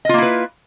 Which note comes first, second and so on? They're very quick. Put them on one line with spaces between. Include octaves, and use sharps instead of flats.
D#5 F4 A#3 E4 B4